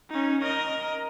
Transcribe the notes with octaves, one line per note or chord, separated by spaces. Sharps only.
C#4 D#4
A#4 D#5